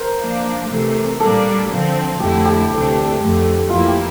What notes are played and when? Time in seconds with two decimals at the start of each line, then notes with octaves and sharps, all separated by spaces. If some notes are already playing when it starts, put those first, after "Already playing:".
Already playing: A#4 C5
0.20 F3 A#3 D4
0.70 C3 E3 A3
1.20 A#2 G3 A#3 D4 A4
1.70 D3 F3 C4
2.20 F2 D3 A3 E4 G4
2.45 G4
2.70 D2 C3 E3 A3 D4
3.20 F2 D3 A3
3.69 F2 E3 A#3 E4 F4
3.87 G4